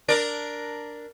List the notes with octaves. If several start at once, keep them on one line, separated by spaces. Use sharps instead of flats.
D4 A#4 D5